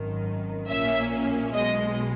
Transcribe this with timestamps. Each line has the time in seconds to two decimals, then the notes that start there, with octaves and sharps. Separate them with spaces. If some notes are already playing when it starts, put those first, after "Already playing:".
Already playing: G#1 F#2 D#3
0.69 A#1 A#2 A#3 C#4 E5
1.53 B1 B2 G#3 D#5